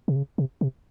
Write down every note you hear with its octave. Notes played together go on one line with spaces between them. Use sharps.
C3
C#3
C3
C3